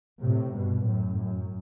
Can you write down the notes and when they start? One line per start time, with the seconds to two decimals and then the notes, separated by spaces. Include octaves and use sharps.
0.23 A2 C3
0.53 G2 B2
0.84 F#2 A2
1.15 F#2